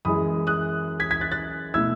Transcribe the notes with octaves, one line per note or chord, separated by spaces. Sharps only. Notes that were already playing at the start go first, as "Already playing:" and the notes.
F#2 E3 G#3 B5 D#6
D#6 F#6
G#6 B6
G#6 B6
F#6 A6
F#6 A6
B2 A3 E4 E6 G#6